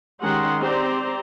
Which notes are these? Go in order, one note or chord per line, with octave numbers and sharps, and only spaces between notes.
D#3 G#3 C#4 G4 F#5 C6
C4 G4 C5 D5 A#5